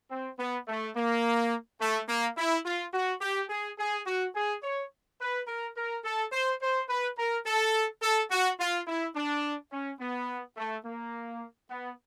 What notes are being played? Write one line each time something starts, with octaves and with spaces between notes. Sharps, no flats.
C4
B3
A3
A#3
A3
A#3
E4
F4
F#4
G4
G#4
G#4
F#4
G#4
C#5
B4
A#4
A#4
A4
C5
C5
B4
A#4
A4
A4
F#4
F4
E4
D4
C#4
B3
A3
A#3
B3